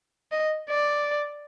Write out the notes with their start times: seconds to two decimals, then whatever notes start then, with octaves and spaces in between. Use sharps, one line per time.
0.31 D#5
0.69 D5